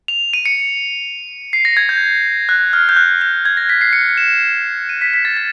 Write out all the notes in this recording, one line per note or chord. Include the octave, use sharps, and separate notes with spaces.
F7
D#7
C#7
C7
A#6
G#6
G6
F#6
F6
G6
F#6
G6
G#6
A#6
B6
C7
C#7
E7
D#7
B6
B6
A6
A6